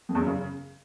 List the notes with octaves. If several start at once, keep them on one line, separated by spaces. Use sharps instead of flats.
F2
E2
F#2
C#3